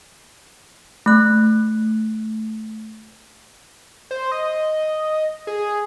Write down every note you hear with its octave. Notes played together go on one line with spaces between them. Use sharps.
A3 F#6
C5
D#5
G#4